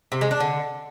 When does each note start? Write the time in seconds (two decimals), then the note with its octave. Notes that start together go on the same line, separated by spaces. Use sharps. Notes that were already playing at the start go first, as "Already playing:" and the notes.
0.12 C3
0.21 G#3
0.31 D4
0.40 D3